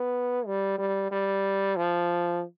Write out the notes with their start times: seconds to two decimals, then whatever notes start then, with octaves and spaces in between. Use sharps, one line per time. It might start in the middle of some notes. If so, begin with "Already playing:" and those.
Already playing: B3
0.47 G3
0.78 G3
1.11 G3
1.76 F3